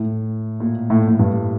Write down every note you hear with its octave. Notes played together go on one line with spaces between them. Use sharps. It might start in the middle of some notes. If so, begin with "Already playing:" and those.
Already playing: A2
A#2
A2
A2
G2